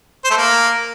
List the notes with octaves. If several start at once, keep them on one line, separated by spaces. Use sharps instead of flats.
C5
A3
A#3